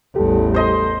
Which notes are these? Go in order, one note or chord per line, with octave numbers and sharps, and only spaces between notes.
A1 E2 G3 G4 A4
A4 C5 D#5 C6